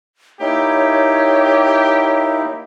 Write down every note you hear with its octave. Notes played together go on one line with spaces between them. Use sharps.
A#3 D#4 E4 G4 C#5